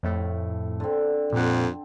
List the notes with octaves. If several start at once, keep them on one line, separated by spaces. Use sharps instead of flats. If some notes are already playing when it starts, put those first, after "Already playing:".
F2 A2 A3
D3 C4
F2 A#2 F#5